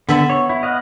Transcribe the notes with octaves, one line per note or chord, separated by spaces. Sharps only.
D3 B3 E5 B5
C#5
E4
D#5 F5 F#5